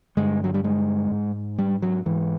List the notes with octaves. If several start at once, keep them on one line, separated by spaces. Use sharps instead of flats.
G2 D3 G#3
F#3
G3
G#3
G#2
G3
F#3
G#2 E3